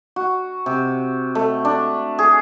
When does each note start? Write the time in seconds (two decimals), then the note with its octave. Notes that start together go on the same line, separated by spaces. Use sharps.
0.16 F#4
0.66 C3
1.35 A3
1.65 D4
2.19 G#4